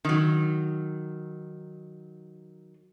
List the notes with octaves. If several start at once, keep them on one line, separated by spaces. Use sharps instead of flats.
D#3 F#3